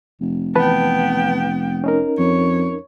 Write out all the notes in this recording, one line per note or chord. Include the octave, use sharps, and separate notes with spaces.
F1
E3 B3 B4 G5 A5
C#4 D#4 A#4
F2 C#5